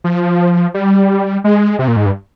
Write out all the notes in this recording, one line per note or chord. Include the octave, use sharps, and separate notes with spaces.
F3
G3
G#3
C3
A#2
G#2
G2